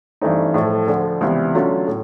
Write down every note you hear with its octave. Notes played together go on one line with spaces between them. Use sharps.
G2 E3 A3 C4 D#4
A2 F3 A3
D2 D3 F3
C#2 C3 E3 G3 B3
D3 F#3 A3 C#4 F4
A2